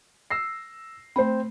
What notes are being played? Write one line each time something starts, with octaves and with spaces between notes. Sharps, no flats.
E6 A#6 C7
A3 C4 C5 B5